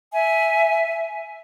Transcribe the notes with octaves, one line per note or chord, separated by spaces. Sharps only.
E5 G#5